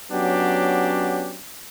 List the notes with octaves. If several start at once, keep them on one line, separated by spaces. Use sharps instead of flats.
F#3 B3 C#4 D4 G4